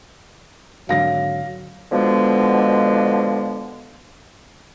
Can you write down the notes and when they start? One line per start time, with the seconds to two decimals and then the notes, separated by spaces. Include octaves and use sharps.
0.89 G#1 D3 F#3 F5 A#6
1.92 B2 D3 F3 G#3 B3